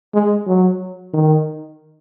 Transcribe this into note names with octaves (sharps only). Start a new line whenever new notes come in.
G#3
F#3
D#3